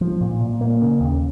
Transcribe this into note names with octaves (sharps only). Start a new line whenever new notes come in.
F3
A#2
A#2
A#3
C#3
D#2